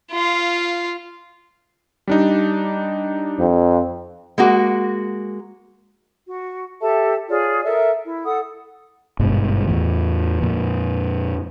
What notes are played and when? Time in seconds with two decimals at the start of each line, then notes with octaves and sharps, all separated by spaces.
0.11 F4 F5
2.08 G3 D4 D#4
3.39 F2
4.38 G#3 A#3 F#4
6.28 F#4
6.81 G4 A4 E5 A5
7.29 F4 G#4 C#5 D5
7.64 A4 A#4 E5
8.06 E4
8.24 A4 F#5 D#6
9.19 G#1 G2 B2 G#3
9.67 E2 A2 E3
10.43 F2 A#2